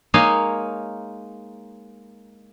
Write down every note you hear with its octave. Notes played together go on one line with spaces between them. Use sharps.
G#3 A#3 D#4 C#5 D#5 F5